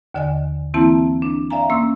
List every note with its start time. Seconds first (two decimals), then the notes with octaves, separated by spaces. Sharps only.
0.14 D#2 D3 D5 D#5 G#5
0.74 E3 A#3 C4 E4 A5
1.22 D4
1.50 D5 E5 F5 G#5 A#5
1.70 A#3 C#4 C6 E6